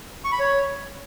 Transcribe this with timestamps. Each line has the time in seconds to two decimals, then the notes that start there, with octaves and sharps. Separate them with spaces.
0.25 C#6
0.32 B5
0.40 C#5